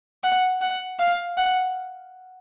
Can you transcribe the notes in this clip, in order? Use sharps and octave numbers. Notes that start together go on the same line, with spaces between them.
F#5
F#5
F5
F#5